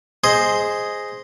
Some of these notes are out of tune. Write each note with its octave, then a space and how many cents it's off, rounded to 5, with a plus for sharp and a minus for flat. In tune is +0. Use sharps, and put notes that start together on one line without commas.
G#4 +0 C5 +0 D#5 +0